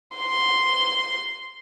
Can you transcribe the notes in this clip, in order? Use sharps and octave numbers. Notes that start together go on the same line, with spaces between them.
C6